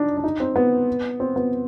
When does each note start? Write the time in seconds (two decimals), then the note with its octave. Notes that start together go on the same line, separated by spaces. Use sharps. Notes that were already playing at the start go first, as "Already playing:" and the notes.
Already playing: D4 D#4
0.17 D4
0.24 D#4
0.40 C4
0.56 B3
1.20 C4
1.36 B3